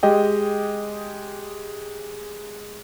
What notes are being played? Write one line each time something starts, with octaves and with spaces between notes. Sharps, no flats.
G#3 G4 D#5 G5